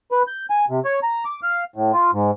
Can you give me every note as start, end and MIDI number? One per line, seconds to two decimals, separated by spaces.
0.12 0.23 71
0.27 0.46 91
0.50 0.65 80
0.70 0.80 48
0.85 1.00 73
1.03 1.24 82
1.25 1.40 86
1.43 1.64 77
1.76 1.92 45
1.93 2.11 65
2.13 2.31 44